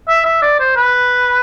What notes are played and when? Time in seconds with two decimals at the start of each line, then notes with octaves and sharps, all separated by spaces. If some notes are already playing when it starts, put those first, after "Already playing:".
0.09 E5
0.25 E5
0.42 D5
0.60 C5
0.76 B4